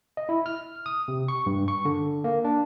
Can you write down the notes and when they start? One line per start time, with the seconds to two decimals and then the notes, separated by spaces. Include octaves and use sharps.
0.17 D#5
0.29 E4
0.46 F6
0.86 D#6
1.08 C3
1.28 C#6
1.46 G2
1.68 C#6
1.85 D3
2.24 A#3
2.44 D4